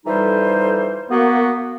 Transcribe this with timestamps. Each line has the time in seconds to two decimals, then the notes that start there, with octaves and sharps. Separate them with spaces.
0.06 F2 E3 G3 D#4 A4 C5
1.10 A#3 B3 F#4